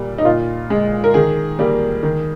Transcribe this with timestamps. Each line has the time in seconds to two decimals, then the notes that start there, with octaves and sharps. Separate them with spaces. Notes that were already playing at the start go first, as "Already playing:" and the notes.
Already playing: A#2 G3 A#3
0.18 D#4
0.25 A#2 F4
0.70 G#3
1.04 A#4
1.14 D#3 G#4
1.59 G3 A#3
2.03 D#3